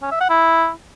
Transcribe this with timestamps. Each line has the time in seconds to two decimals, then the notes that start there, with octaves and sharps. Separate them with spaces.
0.02 C#4
0.11 E5
0.20 F#5
0.30 E4